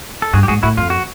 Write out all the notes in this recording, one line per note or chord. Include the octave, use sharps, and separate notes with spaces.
A4
G2 F#4 G#4
G4
G#2 F#4 G#4
A2 E4 F#4
F2 F4
F#4